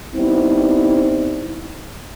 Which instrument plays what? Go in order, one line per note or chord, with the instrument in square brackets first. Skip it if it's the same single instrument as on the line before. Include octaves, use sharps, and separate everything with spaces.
[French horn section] G3 B3 C4 D#4 E4